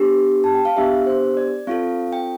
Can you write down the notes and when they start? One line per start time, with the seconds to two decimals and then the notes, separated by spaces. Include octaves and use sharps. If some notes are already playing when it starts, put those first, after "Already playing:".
Already playing: B3 D4 G4
0.44 A5
0.54 G5
0.65 F5
0.76 B3 D4 G4 E5
1.06 C5
1.37 D5
1.67 C4 F4 A4 F5
2.13 G5